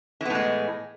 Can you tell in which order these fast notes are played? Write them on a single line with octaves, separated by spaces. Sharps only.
E3 B3 A2 G#3